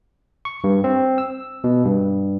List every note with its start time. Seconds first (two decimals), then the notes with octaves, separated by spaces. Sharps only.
0.45 C#6
0.64 G2
0.84 C4
1.18 E6
1.64 B2
1.85 G2